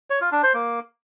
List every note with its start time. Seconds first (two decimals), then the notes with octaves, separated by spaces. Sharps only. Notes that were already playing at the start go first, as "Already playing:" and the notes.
0.10 C#5
0.21 F4
0.32 D4
0.43 C5
0.54 A#3